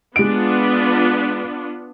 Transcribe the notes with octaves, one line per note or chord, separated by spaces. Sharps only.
G#3 B3 D4 F4 D7